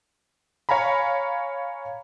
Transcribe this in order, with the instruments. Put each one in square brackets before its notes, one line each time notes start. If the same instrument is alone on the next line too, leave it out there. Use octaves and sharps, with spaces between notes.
[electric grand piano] C#5 F5 G#5 A#5 B5